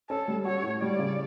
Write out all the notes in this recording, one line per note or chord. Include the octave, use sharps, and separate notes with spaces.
C#4 A4
G3
F#4 C#5
A2
G3 D5
C#3